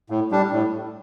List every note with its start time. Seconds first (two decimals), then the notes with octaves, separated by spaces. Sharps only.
0.10 A2
0.31 G3 D4
0.52 A2